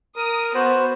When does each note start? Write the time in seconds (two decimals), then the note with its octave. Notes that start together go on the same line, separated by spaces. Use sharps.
0.16 A#4 D#6
0.55 B3 F#4 C5